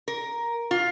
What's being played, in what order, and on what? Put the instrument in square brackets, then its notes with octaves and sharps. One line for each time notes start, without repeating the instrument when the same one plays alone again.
[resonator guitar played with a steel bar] A#4
F4